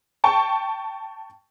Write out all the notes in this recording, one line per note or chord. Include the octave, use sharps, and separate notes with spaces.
G5 A5 C#6